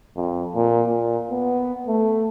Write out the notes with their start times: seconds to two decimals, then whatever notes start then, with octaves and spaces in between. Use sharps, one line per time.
0.16 F2
0.55 A#2
0.88 A#2
1.31 B3
1.87 A3